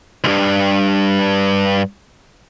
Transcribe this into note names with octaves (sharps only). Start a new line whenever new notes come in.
C2 G2